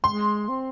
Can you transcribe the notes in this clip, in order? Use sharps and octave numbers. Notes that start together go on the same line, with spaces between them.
G#3 C6
C4